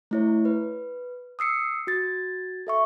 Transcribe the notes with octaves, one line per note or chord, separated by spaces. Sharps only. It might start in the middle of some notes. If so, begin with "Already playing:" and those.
A3 E4 C#5
B4
D#6 E6 C7 C#7
F#4 G#6 A6
A4 E5 C#6